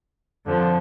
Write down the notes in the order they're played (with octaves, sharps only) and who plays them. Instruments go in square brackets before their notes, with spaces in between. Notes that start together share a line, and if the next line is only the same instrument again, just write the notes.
[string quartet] F2 D3 F3